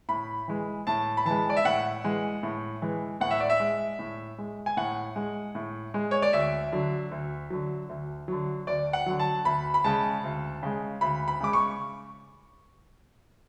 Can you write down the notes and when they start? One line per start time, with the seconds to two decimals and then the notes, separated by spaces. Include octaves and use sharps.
0.09 A2 B5
0.48 E3 G#3
0.87 A2 A5
1.17 B5
1.25 E3 G#3 A5
1.50 D5
1.57 E5
1.65 A2 F#5
2.04 E3 G#3
2.43 A2
2.82 E3 G#3
3.20 A2 F#5
3.31 E5
3.40 D5
3.50 E5
3.60 G#3
3.99 A2
4.38 G#3
4.66 G#5
4.77 A2 F#5
5.16 G#3
5.55 A2
5.94 G#3
6.11 C#5
6.22 D5
6.33 D2 E5
6.72 D3 F#3
7.11 D2
7.50 D3 F#3
7.89 D2
8.28 D3 F#3
8.67 D2 D5
8.93 F#5
9.06 D3 F#3
9.20 A5
9.45 D2 B5
9.74 B5
9.84 C#3 G#3 A5
10.24 D2
10.63 C#3 G#3
11.01 D2 B5
11.28 B5
11.40 C#3 G#3 D6
11.53 C#6